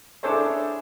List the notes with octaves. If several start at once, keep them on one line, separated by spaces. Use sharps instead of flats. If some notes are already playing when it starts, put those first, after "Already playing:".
D4 E4 G#4 A4 C5 C#5